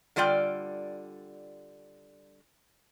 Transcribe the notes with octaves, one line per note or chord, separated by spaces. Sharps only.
D3 G3 F4 D5 G5